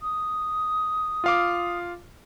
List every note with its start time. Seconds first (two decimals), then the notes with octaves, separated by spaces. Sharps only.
0.01 D#6
1.24 F4 F5 D6